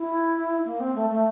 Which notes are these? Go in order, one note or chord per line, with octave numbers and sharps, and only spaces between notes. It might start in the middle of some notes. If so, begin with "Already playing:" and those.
Already playing: E4
A#3
C4
A3
A3